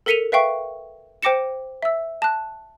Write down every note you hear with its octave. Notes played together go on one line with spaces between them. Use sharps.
A4 A#4 B6 C#7 D#7 F7
B4 E5 F5 G5 C#6
C5 G5 D6 A#6 C#7 E7
E5 E6
A5 F#6